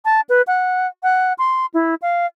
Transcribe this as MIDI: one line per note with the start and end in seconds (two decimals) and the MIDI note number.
0.05 0.21 81
0.29 0.42 71
0.47 0.87 78
1.03 1.33 78
1.38 1.66 84
1.74 1.95 64
2.02 2.26 77